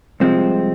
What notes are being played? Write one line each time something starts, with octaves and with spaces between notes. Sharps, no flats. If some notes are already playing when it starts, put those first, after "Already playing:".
C2 C3 F3 G#3 C4